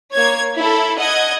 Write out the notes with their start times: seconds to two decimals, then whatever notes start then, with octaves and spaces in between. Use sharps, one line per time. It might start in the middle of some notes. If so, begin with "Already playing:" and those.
0.13 A#3 C#5 G#6
0.57 E4 A4
0.98 D#5 F#5 G#6